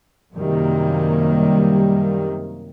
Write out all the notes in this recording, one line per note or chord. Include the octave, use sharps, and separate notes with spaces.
F#2 C3 D#3 G3 A#3